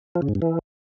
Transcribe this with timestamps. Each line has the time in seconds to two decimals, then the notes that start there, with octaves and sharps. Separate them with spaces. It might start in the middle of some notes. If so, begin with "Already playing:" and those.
0.15 F3
0.22 C#3
0.29 G#2
0.35 G2
0.42 E3